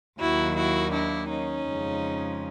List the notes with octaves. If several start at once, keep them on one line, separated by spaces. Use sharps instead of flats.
D#2 D#3 F#3 A#3 E4 F#4
E4 F#4
D4 E4
C#4 D#4
F2 C#3 F3 G#3